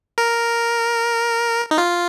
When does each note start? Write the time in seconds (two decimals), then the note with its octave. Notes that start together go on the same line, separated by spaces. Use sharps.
0.18 A#4
1.71 D#4
1.78 F4